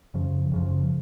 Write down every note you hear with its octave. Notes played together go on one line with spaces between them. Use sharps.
F#2 C#3 F3
F#2 C#3 F3